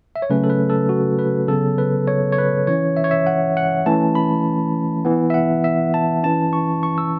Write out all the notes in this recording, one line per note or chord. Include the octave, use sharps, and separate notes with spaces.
E5
C#5
C#3 F#3 A3 C#4 B4
A4
B4
A4
F#4
B4
C#3 F#3 B3 A4
B4
C#5
C#5
B4
E3 C#4 C#5
E5
C#5
E5
F#5
F#5
E3 A3 C#4 A5
B5
E3 B3
E5
F#5
E5
A5
E3 C#4 A5
C#6
C#6
E6